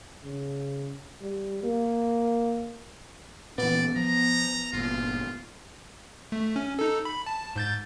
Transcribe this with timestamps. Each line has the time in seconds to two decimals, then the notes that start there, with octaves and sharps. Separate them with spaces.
0.24 C#3
1.22 G3
1.64 A#3
3.58 A#2 E3 B3 D5
3.96 F3 A#5
4.73 G1 A#2 F4
6.32 A3
6.56 C#4
6.79 D#4 A4
7.05 B5
7.26 A5
7.56 G#2 G6 A6